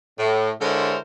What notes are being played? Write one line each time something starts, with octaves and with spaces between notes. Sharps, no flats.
A2
D3 G#3 E4 A#4 C5 C#5